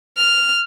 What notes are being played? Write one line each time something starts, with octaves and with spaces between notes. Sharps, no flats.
F6